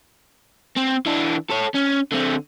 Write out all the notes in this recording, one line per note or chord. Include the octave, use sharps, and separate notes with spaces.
C4
E3 D4
A4 C#5
C#4
D3 C4